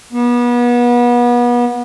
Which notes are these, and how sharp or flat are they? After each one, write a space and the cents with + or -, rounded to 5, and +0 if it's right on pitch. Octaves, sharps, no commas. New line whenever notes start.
B3 -35